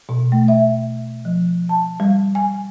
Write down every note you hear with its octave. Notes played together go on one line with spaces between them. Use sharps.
B2
A3
E5
F3
A5
G3
G#5